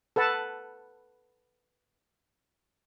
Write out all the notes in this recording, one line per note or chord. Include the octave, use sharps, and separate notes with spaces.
A4 B4 F#5 A5